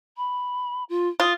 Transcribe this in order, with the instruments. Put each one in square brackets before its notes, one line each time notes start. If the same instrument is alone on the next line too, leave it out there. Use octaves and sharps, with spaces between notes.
[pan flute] B5
F4
[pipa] F4 [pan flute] D#6